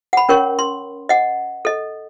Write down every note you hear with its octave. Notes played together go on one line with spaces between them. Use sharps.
F#5 B5
C#4 A#4 C#5 C#6
C6
D#5 F#5
A4 D#5